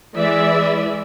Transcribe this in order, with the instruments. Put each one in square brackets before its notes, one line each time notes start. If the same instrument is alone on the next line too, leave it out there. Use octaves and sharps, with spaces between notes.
[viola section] E3 G#3 D5 E5